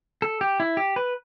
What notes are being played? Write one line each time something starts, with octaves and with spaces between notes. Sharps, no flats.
A4
G4
E4
G4
B4